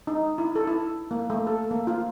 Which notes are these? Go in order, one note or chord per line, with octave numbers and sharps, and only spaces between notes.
D#4
E4
A4
E4
A#3
A3
A4
A#3
F4